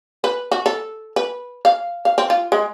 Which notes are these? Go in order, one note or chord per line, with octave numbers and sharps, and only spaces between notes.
B4
F#4
A4
B4
F5
F5
C4
F4
G#3